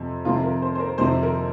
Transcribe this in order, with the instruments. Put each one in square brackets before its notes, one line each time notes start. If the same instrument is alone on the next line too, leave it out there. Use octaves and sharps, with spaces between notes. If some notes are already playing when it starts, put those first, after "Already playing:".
Already playing: [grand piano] F2 C3
F2 C3 D#3 F4
A#4
C5
C5
A#4
F2 C3 D#3 C5
A#4